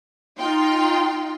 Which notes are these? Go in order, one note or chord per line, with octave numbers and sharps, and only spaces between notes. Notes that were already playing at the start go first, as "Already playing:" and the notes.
D#4 F4 G5 C6